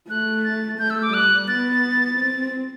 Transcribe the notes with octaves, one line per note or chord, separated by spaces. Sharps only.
A3 F#6
A6
A3 G6
E6
D6
G3 F#6
B3 A6
C4